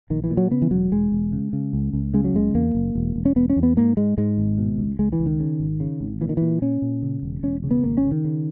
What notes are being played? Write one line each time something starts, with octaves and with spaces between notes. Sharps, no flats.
A#1 D#3
E3
A#2
F#3
C#3 B3
E3
E1 F#3
E1 G#3
E1
C#3
C#3
C#2
C#2
C#3 G#3
F#3
F#1 G#3
E2 A#3
F#1
E1
E1
C#4
E1 B3
C#4
E2
B3
G#2 A#3
G#2 G#3
G#2 G#3
G#1
B2
C#2
C#2 G#3
E3
C#2
D#3
C#3
G#1
C#3
G#1
A#2 E3
D#3
A#2 E3
A#2 C#4
A#2
C#3
E1
E1 C#4
C#3
B3
G#1 A#3
C#4
C#3
D#3
C#3